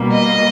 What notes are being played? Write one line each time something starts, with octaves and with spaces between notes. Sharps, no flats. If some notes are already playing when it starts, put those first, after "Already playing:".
Already playing: B2 G3 A#3
D#5